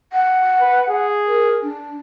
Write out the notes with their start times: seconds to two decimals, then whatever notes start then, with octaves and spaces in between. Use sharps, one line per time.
0.13 F#5
0.60 B4
0.89 G#4
1.27 A#4
1.62 D4